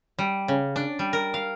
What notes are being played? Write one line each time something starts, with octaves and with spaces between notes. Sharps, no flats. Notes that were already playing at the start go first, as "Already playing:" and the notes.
G3
C#3
D4
G3
A#4
F5